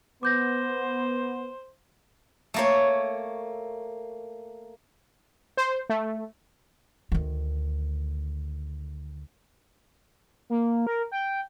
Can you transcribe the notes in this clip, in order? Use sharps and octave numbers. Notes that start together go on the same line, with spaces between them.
B3 C5 D6 G6 A#6
A3 A#3 C#5
C5
A3
D2 D#3
A#3
A#4
G5